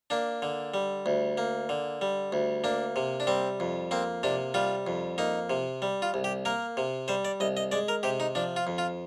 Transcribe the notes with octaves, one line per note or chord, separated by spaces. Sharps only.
A#3 D4
D3
G3
D2
A#3
D3
G3
D2
A#3 D4
C3
D4
G3 C4
F2
A#3 C4
C3 D4
G3 F4
F2
A#3 D#4
C3
G3
F4
C2
G4
A#3 A#4
C3
G3 C5
D5
C2 D#5
D#5
G#3 D5
A#4
C3 G4
D#4
F3 D4
F4
F2
F4